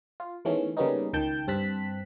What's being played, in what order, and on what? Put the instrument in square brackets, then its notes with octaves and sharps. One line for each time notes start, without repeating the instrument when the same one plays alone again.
[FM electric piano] F4
D#3 E3 G#3 A3 B3 C#4
C#3 G3 A#3 B3 C#4 D#4
C#2 D#3 G5 A5 G6
G2 C4 A5 F#6 B6